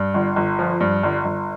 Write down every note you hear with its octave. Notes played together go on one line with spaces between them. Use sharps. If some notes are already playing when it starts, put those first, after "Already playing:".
Already playing: G2
G1
G1
F3
G2
G1
G1